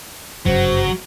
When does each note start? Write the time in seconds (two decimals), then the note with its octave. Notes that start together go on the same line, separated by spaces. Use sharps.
0.46 G1 F#2 C#3 F#3 C5